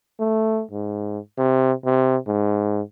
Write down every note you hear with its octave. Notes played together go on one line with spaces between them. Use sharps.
A3
G#2
C3
C3
G#2